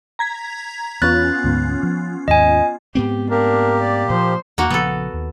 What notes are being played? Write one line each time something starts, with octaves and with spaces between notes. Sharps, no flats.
A#5 G#6 B6
E2 B3 C#4 F4 F#6 A6
D2 G#2
F3
D#2 G#2 D#5 G#5
G#2 B3 C4 G4
A#3 D4 G4 A#4
D5
A#2 F3 C5
E2 A#3 F#4
A#1 C#3 F3 B3 A4
D#2